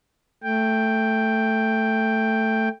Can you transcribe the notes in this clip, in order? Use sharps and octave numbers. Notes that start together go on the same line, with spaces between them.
A3 G5